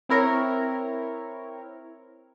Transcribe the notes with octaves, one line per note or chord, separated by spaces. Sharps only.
C4 E4 A#4 C#5